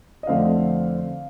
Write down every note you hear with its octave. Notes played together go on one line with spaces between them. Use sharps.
D#5
F2 D3 A3 C4 F5